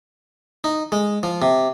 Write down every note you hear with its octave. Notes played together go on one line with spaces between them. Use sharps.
D#4
G#3
F3
C3